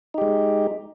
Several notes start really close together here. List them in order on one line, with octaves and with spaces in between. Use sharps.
D#4 G4 G#3